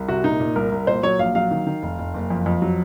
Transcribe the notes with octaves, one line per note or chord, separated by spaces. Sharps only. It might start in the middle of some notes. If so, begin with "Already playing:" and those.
Already playing: C2
C3 F#4
A#2 D#4
A#2
C2 A#4
C2
A#2 C5
F#3 C#5
A#1 F5
F#3 F5
D#3
D#3
F1
F1
F#1
F2
F2
F#3